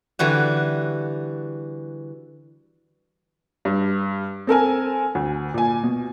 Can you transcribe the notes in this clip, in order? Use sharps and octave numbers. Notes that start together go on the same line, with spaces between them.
D3 E3 G3 F#4
G2
C4 A4 A#4 G#5
D2
A#2 G#5
B2